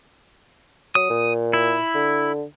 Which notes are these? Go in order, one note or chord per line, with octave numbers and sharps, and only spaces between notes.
F#3 D#6
A#2
E4
D3